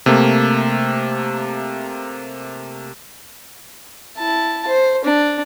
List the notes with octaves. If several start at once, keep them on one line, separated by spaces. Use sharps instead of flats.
C3 A3 A#3
E4 A5
C5
D4